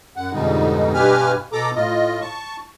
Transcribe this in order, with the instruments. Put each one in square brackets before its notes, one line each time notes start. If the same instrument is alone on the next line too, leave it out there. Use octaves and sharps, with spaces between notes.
[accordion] F#2 F#5
F2 G#2 B2 D3 G3 D#4
G2 B2 G4 B4 G#5 F6
B2 A4 A#5 D6
A2 F4 D#5
A5 C#6